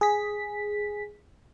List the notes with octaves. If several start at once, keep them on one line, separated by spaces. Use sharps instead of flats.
G#4 B6